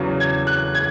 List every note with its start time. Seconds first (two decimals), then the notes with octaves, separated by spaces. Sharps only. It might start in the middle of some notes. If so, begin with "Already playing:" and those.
Already playing: E2 C#3 F#3
0.20 G#6
0.47 F#6
0.75 G#6